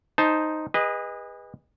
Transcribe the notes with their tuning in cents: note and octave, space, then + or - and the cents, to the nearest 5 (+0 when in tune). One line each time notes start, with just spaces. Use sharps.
D#4 +0 C5 +0 A5 -10
G#4 -35 B4 -10 D#5 +0